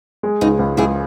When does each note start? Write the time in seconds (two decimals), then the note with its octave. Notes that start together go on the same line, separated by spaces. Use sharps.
0.23 G#3
0.41 C#2 D#4 F#4
0.59 C#2
0.77 C#2 E4 G#4